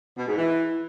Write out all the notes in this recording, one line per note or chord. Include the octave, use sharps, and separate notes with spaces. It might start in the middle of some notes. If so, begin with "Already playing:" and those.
B2
G#2
E3